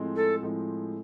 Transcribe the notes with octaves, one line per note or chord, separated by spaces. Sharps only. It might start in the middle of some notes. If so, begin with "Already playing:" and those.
Already playing: A2 F3 G#3 C4
A4
A2 F3 G#3 C4